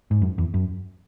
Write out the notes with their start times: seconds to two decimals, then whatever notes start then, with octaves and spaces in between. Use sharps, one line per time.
0.11 G#2
0.22 F#2
0.38 E2
0.54 F#2